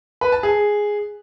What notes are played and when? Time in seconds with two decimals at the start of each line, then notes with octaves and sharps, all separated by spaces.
0.21 B4
0.32 A5
0.43 G#4